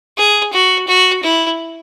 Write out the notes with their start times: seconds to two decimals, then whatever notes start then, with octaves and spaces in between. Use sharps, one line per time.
0.18 G#4
0.53 F#4
0.87 F#4
1.23 E4